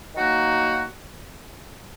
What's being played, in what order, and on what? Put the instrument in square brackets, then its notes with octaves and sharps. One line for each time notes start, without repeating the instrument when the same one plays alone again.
[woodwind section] D#3 F#3 A#3 D#4 F#4